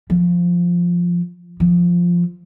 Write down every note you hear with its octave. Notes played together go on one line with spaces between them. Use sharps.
F3
F3